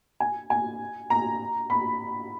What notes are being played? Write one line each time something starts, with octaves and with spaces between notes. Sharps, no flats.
G#5
G#5
A#5
B5